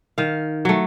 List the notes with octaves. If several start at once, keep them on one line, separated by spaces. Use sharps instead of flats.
D#3 F5
F#3 A3